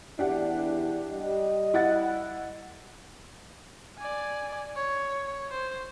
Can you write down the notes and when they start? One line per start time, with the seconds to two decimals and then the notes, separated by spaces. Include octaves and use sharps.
0.19 E2 D4 E4 G4 F#5
1.12 G3 D#5
1.74 E4 F#5 A6
3.98 D5 G#5
4.76 C#5
5.51 C5